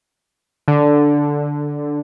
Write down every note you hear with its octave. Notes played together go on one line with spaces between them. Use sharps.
D3